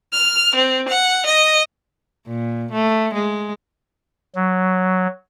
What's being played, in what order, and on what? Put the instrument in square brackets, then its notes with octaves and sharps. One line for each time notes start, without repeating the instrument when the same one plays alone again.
[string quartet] F6
C4
F#5
D#5
[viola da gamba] A#2
A3
G#3
[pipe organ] F#3